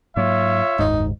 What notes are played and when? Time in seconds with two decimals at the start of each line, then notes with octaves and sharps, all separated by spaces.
0.16 G#2 F#3 A#3 F4 C#5 E5
0.79 F#1 D#2 G#2 D#4